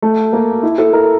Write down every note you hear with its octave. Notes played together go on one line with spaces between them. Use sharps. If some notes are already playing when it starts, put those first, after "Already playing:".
A3
A#3
E4
A4
A#4